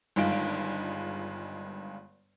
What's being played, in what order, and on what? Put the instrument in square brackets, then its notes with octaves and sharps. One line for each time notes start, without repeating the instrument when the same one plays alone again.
[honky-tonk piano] G1 G2 D#3 G#3 F4 D7